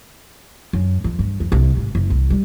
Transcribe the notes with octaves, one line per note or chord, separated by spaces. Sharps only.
F#2
F2
G2
F2
C2
G#1
F#1
C2
G3